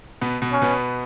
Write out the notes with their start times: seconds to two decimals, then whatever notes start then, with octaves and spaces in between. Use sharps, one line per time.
0.21 B2 B3
0.42 B2 B3
0.53 C#4
0.62 B2 B3